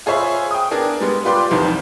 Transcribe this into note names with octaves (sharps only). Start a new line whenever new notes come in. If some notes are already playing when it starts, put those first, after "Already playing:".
F4 G#4 C5 C#5 E5 B5
G5 D#6
B3 D4 G#4 A#4
G3 G#3 B3
F4 G4 B4 D5 C6 D6
C2 F2 C3 D#3 E3 G3